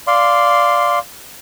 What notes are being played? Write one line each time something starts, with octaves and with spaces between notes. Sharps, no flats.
D5 F5 C6